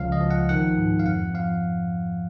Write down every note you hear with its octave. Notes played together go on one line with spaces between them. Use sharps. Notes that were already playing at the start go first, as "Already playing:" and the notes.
Already playing: C#2 F3 F5
D#5
F3
F#5
D#3 F#5
G#2
F5
F2 F#5
F3 F5